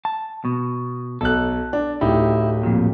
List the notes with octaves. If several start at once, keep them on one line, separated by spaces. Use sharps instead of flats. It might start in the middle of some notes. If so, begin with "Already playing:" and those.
A5
B2
B1 A4 F#6
D4
D1 D#4 E4 G4
F2 A#2